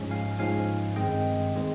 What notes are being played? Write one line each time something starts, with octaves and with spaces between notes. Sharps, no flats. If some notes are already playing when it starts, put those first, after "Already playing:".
Already playing: G#2 F3 G#3 C#4
F5 G#5
G#2 F3 G#3 C#4 F5 G#5
G2 D#3 G#3 C4 D#5 G5
D#3 G#3 C4